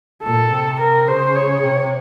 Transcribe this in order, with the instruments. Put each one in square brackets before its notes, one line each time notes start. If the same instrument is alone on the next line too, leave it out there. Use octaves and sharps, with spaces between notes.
[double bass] A#2 [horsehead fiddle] A4
[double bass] C3
[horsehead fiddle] A#4
[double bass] C#3 [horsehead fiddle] C5
[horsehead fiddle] C#5
[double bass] C3